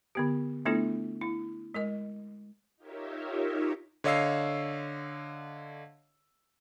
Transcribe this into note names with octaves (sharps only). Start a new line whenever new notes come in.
D3 B3 G4
A3 B3 D4 E4 F4 A4
E4
G#3 A#4 D#5
D#4 F4 G4 A#4 C#5 E5
D3 C#5 D#5 F5 E6 C7